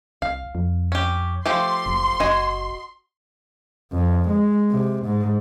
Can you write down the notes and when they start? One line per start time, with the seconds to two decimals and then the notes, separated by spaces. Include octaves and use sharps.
0.22 C2 F5
0.55 F2
0.92 C#4 G4
1.46 F3 A3 G4 C6
1.86 F#1
2.20 F#1 F#4 D#5 G#5
3.93 F2
4.29 G#3
4.71 C3
5.06 G#2